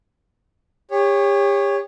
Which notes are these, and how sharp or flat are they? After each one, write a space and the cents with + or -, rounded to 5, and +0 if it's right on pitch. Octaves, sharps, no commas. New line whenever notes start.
G4 +40 C#5 +0